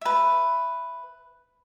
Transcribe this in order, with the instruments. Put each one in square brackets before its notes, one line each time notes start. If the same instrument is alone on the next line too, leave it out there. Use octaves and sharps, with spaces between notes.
[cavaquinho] B4 E5